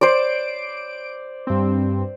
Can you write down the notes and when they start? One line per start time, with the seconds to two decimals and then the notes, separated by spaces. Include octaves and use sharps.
0.01 C5 D5 D7
1.47 G2 C4